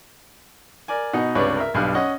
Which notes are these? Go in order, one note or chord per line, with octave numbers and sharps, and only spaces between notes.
A#4 D5 G#5
B2 D#4 F#5
C#2 G2 C3 B4 C#5 D5
A#4 E5
B1 G2 F5 F#6
C#4 D#5 F#5